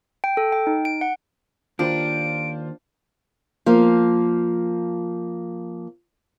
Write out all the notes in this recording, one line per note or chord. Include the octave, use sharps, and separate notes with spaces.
G5
A4
G5
D#4
D7
F#5
D#2 D4 F4 C5 D7
F3 A#3